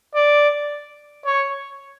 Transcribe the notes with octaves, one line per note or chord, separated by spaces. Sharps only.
D5
C#5